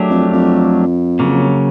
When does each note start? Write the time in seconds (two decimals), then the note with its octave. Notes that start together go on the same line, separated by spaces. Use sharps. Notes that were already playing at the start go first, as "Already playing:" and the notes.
Already playing: F#3 A3 D4 G4 A#4
0.11 F2
0.33 F2
1.20 C#3 F#3 A#3